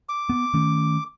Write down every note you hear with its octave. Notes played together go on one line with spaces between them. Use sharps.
D6
B3
D#3 A3 C#4